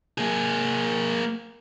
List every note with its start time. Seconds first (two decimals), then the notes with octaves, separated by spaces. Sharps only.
0.18 A#3 G#4